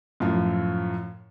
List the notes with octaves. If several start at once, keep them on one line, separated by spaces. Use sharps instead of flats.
F#2 A2 F3